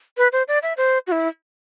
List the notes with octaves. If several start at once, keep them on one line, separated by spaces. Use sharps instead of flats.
B4
C5
D5
E5
C5
F#4
E4